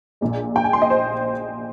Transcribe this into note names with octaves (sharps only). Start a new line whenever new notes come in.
A#1 A#2 G#3
G5
G#5
C6
D#5
C5